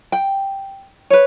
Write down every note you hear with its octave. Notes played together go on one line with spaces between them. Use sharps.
G5
B4 C#5